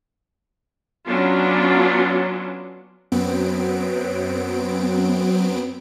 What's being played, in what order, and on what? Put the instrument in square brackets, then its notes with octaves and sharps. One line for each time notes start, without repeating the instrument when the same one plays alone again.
[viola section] F#3 B3 C#4 D4 F4
[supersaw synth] F#2 F#3 B3 C4 D7